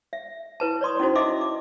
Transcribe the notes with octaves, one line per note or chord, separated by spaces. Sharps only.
E5
E4 B4 A5
C#5 D5 C6 D#6
C#4 D#4 E4 F#4 C5
D#4 A4 D#5 E5 C6 D6
D6